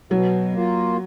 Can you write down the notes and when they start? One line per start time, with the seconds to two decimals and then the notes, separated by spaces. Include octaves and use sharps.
0.11 B2 F#3
0.54 A#3 F4